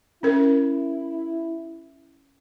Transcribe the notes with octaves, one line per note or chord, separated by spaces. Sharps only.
C#4 E4 A#4